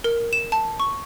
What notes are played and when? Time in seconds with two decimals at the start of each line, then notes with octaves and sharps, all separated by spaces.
0.04 A#4
0.33 E7
0.52 A5
0.80 C#6